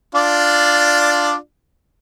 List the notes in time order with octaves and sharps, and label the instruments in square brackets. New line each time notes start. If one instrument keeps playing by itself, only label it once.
[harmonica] D4 F4 D5